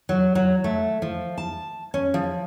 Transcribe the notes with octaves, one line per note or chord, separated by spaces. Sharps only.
F#3
F#3
A3
F3
A5
C#4
F3